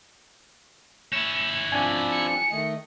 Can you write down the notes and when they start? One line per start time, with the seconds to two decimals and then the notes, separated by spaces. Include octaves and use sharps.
1.13 C#4 E4 E7
1.72 F3 C4 D4 G#5
2.14 C#7
2.51 D#3 A3 D#5